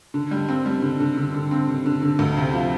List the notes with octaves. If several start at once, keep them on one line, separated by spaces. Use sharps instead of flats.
D3
G3
C4
G3
D3
D3
D3
D3
C4
D3
D3
D3
D2
C3
F3